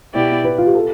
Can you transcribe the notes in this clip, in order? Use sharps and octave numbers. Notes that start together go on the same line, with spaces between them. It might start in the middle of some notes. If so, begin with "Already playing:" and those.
B2 B3 E4 G4 D5
B4
F4
G4
A4